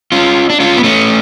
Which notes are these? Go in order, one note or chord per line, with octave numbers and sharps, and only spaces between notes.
C#4 F4
D4
C#4 F4
B3
A3 C#4